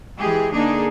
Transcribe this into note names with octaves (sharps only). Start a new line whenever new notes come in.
E3 G#3 G4 G#4
D3 A#3 D4 D#4 G#4